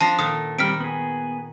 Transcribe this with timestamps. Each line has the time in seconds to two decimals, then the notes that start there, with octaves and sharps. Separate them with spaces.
0.01 F3 D4 A5 A#6
0.19 A#2 D#3 A4 D#6
0.58 D#3 G3 C4 F6 B6 D7
0.80 B3 G#4